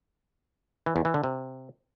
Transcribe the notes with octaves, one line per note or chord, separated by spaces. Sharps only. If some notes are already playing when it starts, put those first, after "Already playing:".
E3
E2
E3
D3
C3